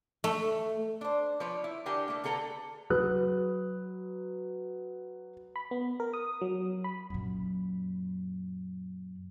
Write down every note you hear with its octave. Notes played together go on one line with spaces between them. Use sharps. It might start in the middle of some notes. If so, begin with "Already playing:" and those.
A3
D4 C5
F3 B4 C#5 D5
E4
D3 D4 G4 A#4 G#5
A3 A#3
D3 G#4 A4 B4 A#5
F#3 B4 D#6 F#6
B5
B3
A#4
D#6
F#3
B5
F#2 A#2